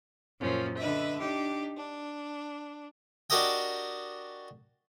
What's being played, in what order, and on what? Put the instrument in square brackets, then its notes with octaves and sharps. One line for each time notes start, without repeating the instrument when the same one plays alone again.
[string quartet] F#2 A#2 F3 C#4
D3 B4 D#5 E5
D4 D#4 G4
D4
[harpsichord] D4 F#4 G4 A#4 D#5 G5